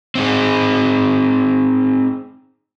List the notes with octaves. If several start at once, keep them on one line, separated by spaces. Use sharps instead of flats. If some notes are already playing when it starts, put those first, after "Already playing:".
C4 D#4 G#4